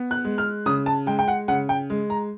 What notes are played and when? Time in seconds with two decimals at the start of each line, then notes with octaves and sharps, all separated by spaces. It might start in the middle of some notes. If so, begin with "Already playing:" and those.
Already playing: B3
0.11 F#6
0.25 G#3
0.38 F6
0.66 C#3 D#6
0.86 A5
1.06 G#3 G5
1.19 G5
1.28 F#5
1.48 C#3 F#5
1.69 G5
1.90 G#3
2.10 A#5